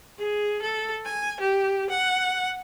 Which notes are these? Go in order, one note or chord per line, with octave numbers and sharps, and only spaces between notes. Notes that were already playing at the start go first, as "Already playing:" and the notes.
G#4
A4
G#5
G4
F#5